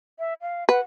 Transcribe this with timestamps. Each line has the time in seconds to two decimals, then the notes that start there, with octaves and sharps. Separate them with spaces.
0.19 E5
0.42 F5
0.69 B4 F#5